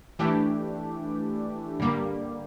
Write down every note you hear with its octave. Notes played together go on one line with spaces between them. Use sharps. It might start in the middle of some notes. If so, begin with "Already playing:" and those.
E3 A3 D4 G4
G2 D3 G3 A#3